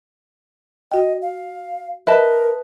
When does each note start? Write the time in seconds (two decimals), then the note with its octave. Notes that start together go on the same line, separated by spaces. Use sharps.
0.92 F#4 D#5 G5
1.22 F5
2.07 A#4 B4 D#5 E5 A5